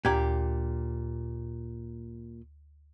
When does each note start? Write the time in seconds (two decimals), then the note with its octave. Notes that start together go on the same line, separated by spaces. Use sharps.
0.05 D2 A#2 G4 A#5 G#6